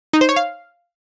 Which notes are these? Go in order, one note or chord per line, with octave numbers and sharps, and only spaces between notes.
D#4
C5
C#5
F5